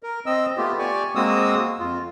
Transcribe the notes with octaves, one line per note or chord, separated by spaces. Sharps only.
A#4
C4 D#5 E6
A3 B3 F4 G4
G4 D5 G#5 C#6
G#3 A#3 C4 F#4 D#6 E6
F2 F4